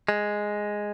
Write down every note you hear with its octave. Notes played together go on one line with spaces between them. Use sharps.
G#3